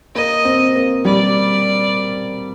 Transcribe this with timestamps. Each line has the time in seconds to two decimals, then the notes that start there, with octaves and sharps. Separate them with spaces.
0.15 A#3 D#5
0.45 C4
0.75 A#3
1.05 G3 D5